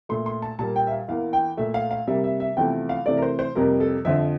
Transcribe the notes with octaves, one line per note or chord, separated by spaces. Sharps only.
A#2 A3 C6
C6
A5
A#2 G3 A#3 A5
G5
E5
F5
E2 E3 A#3 F5
G5
A#2 A3 E5
F5
F5
C3 G3 A#3 E5
E5
E5
E2 C3 F3 A3 G5
F5
C3 E3 A3 D5
A#4
C5
C5
F2 C3 G3 A#3 A#4
A4
F2 D3 F3 E5